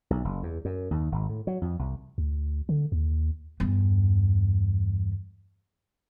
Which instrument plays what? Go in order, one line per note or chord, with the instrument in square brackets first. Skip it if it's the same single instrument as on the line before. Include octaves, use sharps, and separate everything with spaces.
[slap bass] B1
F#1
E2
F#2
D#2
G#1
A2
F#3
F2
C2
[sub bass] D2
D3
D#2
[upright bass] E2 G2